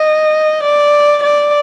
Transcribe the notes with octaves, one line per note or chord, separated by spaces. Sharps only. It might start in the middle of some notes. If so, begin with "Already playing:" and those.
Already playing: D#5
D5
D5